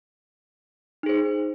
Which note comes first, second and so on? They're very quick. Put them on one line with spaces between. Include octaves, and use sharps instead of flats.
D#4 G#4 C5